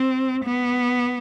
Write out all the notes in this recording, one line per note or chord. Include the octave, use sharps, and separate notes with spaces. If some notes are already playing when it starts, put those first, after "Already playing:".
Already playing: C4
B3